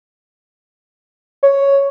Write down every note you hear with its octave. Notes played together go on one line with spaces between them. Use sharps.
C#5